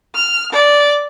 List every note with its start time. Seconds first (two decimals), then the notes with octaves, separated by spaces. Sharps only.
0.15 F6
0.52 D5